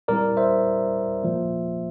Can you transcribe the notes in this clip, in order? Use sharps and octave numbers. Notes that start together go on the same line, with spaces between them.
A#2 G3 C4 E4 A#4 D5
C5 E5
A#2 F3 A#3